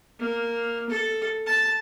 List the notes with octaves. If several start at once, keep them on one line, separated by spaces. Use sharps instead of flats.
A#3
A4
A5